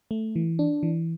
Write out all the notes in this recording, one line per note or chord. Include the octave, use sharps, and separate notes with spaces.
A3
E3
D4
E3